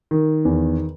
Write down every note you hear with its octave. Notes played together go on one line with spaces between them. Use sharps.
D#3
E2